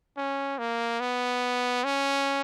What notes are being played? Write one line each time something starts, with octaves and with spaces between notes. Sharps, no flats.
C#4
A#3
B3
C#4